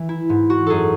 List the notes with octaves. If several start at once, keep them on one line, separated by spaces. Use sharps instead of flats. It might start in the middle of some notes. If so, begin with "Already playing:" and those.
Already playing: E3
E4
G#2
F#4
F#2 G#4 A4